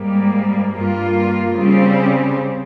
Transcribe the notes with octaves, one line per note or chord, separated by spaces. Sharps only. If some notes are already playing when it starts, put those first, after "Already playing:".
Already playing: G#2 G3 A#3
G2 G3 A#3 F4
C#3 G3 C4